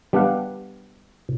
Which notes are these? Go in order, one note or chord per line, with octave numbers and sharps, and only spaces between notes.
G3 B3 D4 G4 F5 F#5